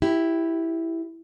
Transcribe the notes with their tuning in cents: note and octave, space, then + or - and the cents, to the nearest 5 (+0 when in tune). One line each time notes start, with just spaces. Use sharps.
E4 +0 G4 -5